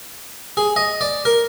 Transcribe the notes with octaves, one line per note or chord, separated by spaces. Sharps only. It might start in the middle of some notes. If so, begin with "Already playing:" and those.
G#4
D#5
D5
A#4